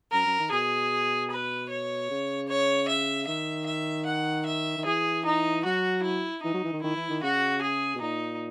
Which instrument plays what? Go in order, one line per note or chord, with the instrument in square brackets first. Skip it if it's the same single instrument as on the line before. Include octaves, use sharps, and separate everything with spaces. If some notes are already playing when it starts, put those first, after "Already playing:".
[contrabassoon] F#2 [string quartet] A#4
[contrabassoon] F#2
D#3
[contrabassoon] B2 [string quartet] G#4
[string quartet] B4
C#5
[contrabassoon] C#3
[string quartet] C#5
E5
[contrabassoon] D#3 [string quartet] E5
[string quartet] E5
F#5
E5
[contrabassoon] D#3
[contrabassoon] E3 [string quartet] G#4
[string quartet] D#4
[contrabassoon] F#3 [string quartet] F#4
[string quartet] E4
[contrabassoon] E3 [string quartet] D#4
[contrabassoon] F#3
E3
D#3
[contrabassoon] D#3 [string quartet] E4
[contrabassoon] E3
D#3
[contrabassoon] C#3 [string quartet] F#4
[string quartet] G#4
[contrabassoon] B2
[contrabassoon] A#2 [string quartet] D#4